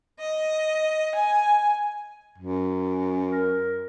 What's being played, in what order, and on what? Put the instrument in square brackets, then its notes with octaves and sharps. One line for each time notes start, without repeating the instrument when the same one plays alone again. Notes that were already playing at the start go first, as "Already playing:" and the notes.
[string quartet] D#5
G#5
[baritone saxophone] F#2
[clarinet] A#4